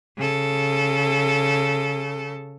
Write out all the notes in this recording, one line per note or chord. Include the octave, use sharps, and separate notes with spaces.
C#3 A4